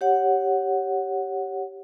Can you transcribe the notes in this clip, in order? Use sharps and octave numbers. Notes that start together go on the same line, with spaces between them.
G4 C#5 F#5